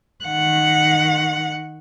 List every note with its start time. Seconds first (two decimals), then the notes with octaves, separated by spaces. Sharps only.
0.25 D#3 F#5